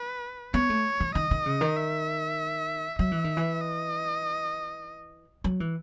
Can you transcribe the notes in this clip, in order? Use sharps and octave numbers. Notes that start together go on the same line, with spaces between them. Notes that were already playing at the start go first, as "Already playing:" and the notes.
Already playing: B4
B3 C#5
A3
E3
D#3 D#5
D#3
C#3
D#3
E5
F#3 E5
E3
D#3
E3
D#5
F#3
E3